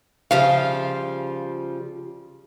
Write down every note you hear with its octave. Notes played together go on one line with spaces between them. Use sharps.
C#3 F3 G3 F5